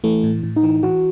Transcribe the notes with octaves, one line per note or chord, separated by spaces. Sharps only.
E3 A3
A2
A2
D#4
E3
E3 F#4